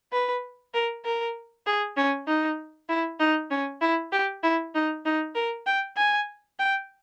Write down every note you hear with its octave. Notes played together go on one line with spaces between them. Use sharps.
B4
A#4
A#4
G#4
C#4
D#4
E4
D#4
C#4
E4
G4
E4
D#4
D#4
A#4
G5
G#5
G5